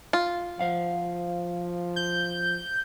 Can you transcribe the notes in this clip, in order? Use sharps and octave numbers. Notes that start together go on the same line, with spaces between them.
F4
F3 C5 F5 F#5
G6